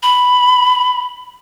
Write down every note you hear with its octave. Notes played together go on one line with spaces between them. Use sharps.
B5